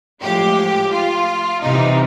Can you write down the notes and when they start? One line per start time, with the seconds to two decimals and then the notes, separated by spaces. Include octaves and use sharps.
0.23 A2 F3 G#3 G4
0.92 F4
1.62 C3 E3 G3 D#4